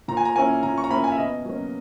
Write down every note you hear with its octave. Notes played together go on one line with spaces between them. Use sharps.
A#2 A#5
G#5
A#5
A#3 C#4 E4 G#5
A#2 A#5
C#6
A#5
A#3 C#4 E4 B5
G#5
E5
B2 D#5
F#3 A#3 C#4